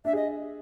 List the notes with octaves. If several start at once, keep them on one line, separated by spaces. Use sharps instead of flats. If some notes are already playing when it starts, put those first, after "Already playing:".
D4 E5
G#4
D#5